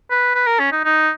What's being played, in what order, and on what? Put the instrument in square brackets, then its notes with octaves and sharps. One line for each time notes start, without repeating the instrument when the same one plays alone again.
[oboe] B4
B4
A#4
C#4
D#4
D#4